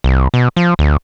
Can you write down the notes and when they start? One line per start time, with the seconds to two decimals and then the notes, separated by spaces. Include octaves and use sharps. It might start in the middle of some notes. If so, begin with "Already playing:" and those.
0.04 C2
0.34 B2
0.56 F3
0.79 D2